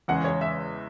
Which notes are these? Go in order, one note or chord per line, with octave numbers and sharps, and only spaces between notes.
E2 C#3 G#3 C#4 F#5
C#5
E5